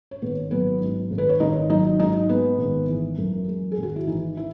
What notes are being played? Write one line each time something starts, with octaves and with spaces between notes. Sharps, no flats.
C#5
G#1 B3 B4
F#3 B3 B4
G#2
G#1
B4
C#5
G#1 D#4 D#5
F#3 D#4 D#5
G#2 D#4 D#5
G#3 B3 B4
G#1
E3
F#2
G#3
G#4
G#1 F#4
E4
E3 D#4
E4